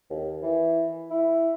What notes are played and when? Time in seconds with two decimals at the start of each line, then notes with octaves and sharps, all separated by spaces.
0.10 D#2
0.43 E3
1.11 E4